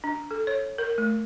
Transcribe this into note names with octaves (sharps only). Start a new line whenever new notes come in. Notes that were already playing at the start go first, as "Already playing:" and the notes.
D4
A4
C#5
A#4
A3